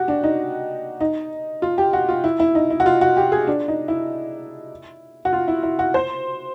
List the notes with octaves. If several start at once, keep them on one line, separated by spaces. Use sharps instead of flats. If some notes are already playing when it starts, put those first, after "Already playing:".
Already playing: F#4 G4
D4
D#4
D#4
F4
G4
F#4
F4
E4
E4
D#4
E4
F#4
F4
F#4
G4
G#4
D4
D#4
E4
F#4
F4
E4
E4
F#4
C5